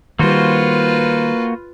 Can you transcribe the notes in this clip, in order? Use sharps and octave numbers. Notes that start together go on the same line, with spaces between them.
D#3 G3 A#3 F4 F#4 B4 C5